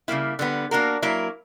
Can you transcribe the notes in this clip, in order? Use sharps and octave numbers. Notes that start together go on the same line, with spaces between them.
C#3 G3 A#3 E4
D3 G3 B3
A#3 D4 F#4 A#4
F#3 A#3 E4 A#4